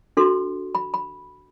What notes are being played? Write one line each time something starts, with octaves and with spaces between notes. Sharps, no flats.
D4 F#4 A4 C6
B5
B5